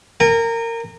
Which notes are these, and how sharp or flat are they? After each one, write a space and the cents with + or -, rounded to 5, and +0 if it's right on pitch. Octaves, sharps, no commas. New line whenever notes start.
A#4 -20 G#5 -45